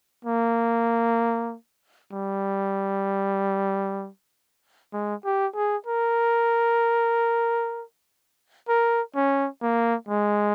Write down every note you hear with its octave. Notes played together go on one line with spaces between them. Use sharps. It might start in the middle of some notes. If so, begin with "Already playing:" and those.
A#3
G3
G#3
G4
G#4
A#4
A#4
C#4
A#3
G#3